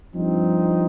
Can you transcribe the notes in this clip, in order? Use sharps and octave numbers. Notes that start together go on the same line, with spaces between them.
G2 F3 C4 D#4